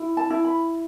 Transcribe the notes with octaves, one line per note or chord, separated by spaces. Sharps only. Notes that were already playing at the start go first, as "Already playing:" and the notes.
Already playing: E4
A5
E4
B5